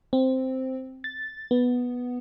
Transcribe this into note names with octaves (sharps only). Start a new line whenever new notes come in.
C4
A6
B3